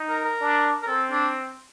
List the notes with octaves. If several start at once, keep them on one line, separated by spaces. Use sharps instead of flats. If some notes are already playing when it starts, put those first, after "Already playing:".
Already playing: D#4
A#4
A#4
D4
A#4
C4 A4
D4